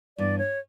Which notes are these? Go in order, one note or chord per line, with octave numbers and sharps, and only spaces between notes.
G2 E3 B3 D5
C#5